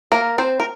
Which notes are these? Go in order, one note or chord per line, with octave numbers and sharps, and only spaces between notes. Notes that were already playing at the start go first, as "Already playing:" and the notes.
A#3 A#4
C4 C5
A#4